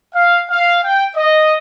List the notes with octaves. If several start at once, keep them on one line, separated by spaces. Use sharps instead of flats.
F5
F5
G5
D#5